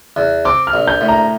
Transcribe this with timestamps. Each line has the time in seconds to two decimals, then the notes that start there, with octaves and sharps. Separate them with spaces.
0.16 E2
0.45 C4 D6
0.67 F6
0.73 A#1
0.88 G6
1.01 A2
1.08 A#5